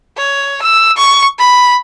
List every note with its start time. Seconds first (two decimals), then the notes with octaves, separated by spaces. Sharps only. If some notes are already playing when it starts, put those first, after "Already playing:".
0.17 C#5
0.62 E6
0.97 C#6
1.39 B5